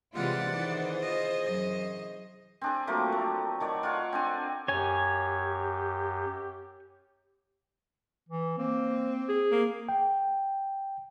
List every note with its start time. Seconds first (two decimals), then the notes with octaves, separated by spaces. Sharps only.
0.15 C3 E3 G#3 F4 G4 D5 F#5
0.50 D#3 E3 G#4 C5
1.02 F4 D#5
1.46 F#2 E3 D#5
2.61 C4 D4 G#4
2.87 F3 F#3 A3 A#3
3.12 A3
3.60 D#3 C#5 D5
3.83 F4 C#5 F#5 A5
4.12 C4 D4 G#5
4.68 F#2 G4 C#5 G#5
8.29 E3
8.58 A#3 C4
9.29 G#4
9.51 A#3
9.89 G5